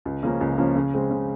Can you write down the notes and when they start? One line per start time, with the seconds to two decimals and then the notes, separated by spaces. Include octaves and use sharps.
0.05 C#2
0.23 C#3 F3 A#3 C#4
0.41 C#2
0.58 C#3 F3 A#3 C#4
0.76 C#3
0.94 G#3 C4
1.11 C#3